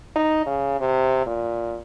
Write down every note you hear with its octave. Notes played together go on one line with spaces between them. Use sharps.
D#4
C#3
C3
A#2